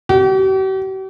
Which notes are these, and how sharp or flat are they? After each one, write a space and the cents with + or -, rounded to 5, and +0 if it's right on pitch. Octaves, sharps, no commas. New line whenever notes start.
G4 -45